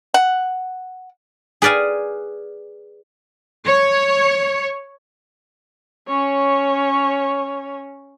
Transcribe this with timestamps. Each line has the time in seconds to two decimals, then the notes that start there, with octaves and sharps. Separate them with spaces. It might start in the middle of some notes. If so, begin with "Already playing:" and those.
0.14 F#5
1.62 G#4 B4 D5 F5 G#5
3.66 C#5
6.07 C#4 C#5